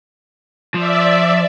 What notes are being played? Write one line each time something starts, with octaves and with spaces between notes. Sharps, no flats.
F3 D5 E5